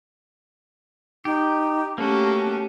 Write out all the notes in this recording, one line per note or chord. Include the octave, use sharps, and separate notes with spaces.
D#4 G4
A3 A#3 C#4 F#4 G4 A5